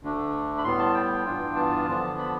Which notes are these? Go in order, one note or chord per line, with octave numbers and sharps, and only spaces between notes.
D2 D3 A3 D4
B5
A2 G3 B3 C6
A5
G5
G2 E3 B3 D4 F4
A5
D3 F3 B3 D4
B5